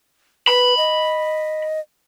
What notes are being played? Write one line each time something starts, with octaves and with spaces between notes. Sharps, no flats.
B4 B5
D#5